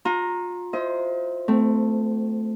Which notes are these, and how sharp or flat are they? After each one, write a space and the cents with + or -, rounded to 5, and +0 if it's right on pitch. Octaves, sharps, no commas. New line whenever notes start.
F4 +35 A#5 +0
E4 +45 C5 +0 D#5 +35
A3 +0 C4 -25